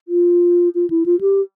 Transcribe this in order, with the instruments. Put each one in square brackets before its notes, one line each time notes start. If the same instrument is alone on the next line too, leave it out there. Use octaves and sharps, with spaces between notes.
[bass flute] F4
F4
E4
F4
G4